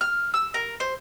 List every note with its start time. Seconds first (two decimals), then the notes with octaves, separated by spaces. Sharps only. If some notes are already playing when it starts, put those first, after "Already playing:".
0.01 F6
0.34 E6
0.54 A#4
0.80 C5